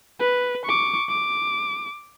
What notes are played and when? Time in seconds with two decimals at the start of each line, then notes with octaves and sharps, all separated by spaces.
0.20 B4
0.65 C#6 D6
1.09 D6